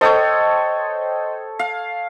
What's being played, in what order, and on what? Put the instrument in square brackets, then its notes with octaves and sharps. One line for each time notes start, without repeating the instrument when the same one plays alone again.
[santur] A4 C#5 [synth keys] C5 D#5 G5
[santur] F5